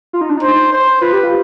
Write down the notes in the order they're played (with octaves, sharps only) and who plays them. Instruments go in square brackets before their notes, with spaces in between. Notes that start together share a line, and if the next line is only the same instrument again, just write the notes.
[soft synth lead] F4
D#4
D4
D#4
[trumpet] C5
C5
[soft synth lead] F4 [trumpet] B4
[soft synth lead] G4
F4